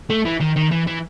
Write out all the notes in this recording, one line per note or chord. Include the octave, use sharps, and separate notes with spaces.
A3
E3
D#3
D#3
E3
E3